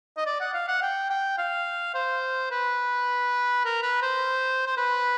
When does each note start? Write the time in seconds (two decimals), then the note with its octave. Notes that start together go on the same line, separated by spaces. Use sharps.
0.17 D#5
0.26 D5
0.40 F#5
0.54 F5
0.68 F#5
0.82 G5
1.10 G5
1.38 F5
1.94 C5
2.51 B4
3.65 A#4
3.83 B4
4.02 C5
4.66 C5
4.77 B4